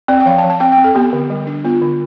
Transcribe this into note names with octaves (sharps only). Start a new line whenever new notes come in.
C4 D5
G5
F3 F5
A5
F3
A5
C4 G5
G5
C4
A4
B3 G4
D3
G3
D4
B3 F4
D3